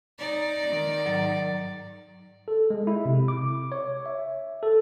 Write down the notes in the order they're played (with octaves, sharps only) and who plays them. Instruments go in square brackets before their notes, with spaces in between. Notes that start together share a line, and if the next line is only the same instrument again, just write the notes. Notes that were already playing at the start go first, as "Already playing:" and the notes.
[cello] D#4 [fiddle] D5
[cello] D#3 D#4
[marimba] G#2 F#3 A6
[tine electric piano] A4
G#3
E4
C3
D6
C#5
E5
A4